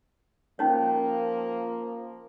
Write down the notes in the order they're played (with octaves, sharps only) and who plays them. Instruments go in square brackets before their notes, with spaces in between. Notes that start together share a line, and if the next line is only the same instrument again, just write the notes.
[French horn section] F3 A#3 [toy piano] C#4 D#4 C#5